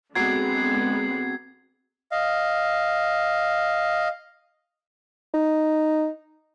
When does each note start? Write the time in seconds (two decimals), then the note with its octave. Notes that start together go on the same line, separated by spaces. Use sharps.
0.15 D3 F#3 G#3 B3 C4 D6 G#6 C7
2.12 D#5 F5
5.34 D#4